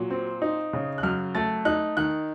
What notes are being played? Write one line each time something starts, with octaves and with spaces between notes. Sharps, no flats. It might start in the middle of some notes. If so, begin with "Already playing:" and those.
Already playing: A#2 F#3
C4
D#4
C#3
F#6
F#2 F6
A3 A6
D#4 F#6
D#3 F#6